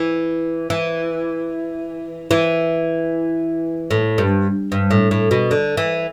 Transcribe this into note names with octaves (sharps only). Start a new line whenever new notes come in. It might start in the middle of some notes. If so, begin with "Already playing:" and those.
Already playing: E3
E3
E3
A2
G2
G2
A2
A2
B2
D3
E3